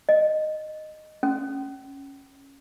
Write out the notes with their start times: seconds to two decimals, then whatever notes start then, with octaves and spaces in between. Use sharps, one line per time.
0.09 D#5
1.23 C#4